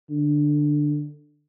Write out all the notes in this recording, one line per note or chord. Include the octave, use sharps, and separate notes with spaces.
D3